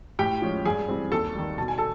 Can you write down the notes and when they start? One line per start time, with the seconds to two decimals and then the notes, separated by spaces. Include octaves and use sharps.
0.19 A2 G4 G5
0.42 F3 G#3 C#4
0.65 G2 G#4 G#5
0.88 E3 G3 C4
1.11 D#2 A4 A5
1.35 D#3 G3
1.58 B2 A5
1.68 G#5
1.78 A4 A5